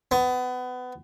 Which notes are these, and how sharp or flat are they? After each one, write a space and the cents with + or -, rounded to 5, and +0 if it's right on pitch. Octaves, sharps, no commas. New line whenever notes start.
B3 +25